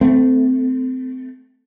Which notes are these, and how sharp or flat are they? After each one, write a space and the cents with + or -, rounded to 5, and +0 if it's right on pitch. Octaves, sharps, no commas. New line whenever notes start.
A3 +0 C4 -30